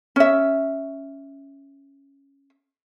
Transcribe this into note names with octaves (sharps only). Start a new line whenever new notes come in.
C#4 E5